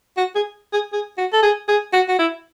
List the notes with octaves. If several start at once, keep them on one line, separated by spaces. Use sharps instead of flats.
F#4
G#4
G#4
G#4
F#4
A4
G#4
G#4
F#4
F#4
E4